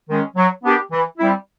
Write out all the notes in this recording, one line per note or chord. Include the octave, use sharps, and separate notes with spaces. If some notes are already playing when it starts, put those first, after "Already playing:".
D#3 G#3 C#4
F#3
B3 D4 G4 A#4
E3
G3 C4 E4